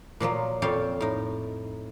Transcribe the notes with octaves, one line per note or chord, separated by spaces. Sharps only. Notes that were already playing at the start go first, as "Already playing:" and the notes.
A#2 F3 F#3 A#3
F2 A#2 A4 C#5 F5 G5
A2 D#4